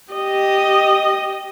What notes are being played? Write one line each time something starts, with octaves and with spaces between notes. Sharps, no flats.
G4 D#5